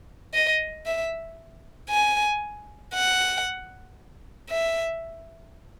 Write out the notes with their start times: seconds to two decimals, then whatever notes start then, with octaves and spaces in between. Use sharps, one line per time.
0.34 D#5
0.86 E5
1.90 G#5
2.94 F#5
4.50 E5